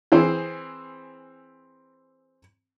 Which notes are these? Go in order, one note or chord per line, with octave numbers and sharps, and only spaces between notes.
E3 C4 G#4 C5